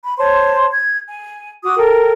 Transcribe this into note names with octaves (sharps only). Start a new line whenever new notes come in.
B5
C5 C#5 A5 C6
G#6
G#5
F#4 D6 D#6
A4 A#4 G5